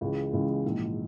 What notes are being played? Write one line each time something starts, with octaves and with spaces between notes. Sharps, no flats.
C#2 C#3 E3 G#3
C#2 C#3 E3 G#3
A#1 G#2 E3